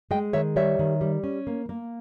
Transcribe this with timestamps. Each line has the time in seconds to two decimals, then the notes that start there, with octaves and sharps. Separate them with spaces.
0.11 G#3 D#5 G5
0.33 D#3 C#5 E5
0.56 G3 C#5 E5
0.79 D#3
1.01 G3
1.24 C#4
1.47 A#3
1.69 A#3